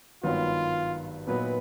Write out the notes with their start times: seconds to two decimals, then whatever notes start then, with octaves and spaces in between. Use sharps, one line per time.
0.23 G#1 G2 D#3 F#3 B3 F4
1.27 A#2 F#3 B3 D#4 B4